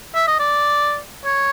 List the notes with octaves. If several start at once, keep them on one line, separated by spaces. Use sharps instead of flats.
E5
D#5
D5
C#5